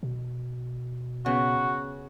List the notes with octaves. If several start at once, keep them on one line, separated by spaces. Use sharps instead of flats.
B2
C#3 B3 F#4